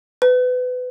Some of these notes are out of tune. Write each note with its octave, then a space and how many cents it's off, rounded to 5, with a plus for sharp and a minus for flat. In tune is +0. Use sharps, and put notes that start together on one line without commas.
B4 +25